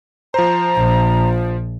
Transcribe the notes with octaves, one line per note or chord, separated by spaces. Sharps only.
F3 C5 A#5
A#1